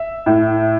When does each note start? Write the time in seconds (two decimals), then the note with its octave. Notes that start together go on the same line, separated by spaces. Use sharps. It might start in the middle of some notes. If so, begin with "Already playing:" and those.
Already playing: E5
0.26 A2